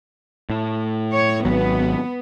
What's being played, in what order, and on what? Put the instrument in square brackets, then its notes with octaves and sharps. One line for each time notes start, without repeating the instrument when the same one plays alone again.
[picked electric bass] A2
[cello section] C#5
[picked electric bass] G#1 F#3 [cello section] B3